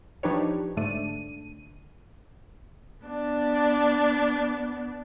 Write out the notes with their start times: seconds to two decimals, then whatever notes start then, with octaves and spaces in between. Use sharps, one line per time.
0.23 F3 D4 D#4 G4 B4 C#5
0.76 G#2 D3 A3 D4 D#7
3.05 B3 D4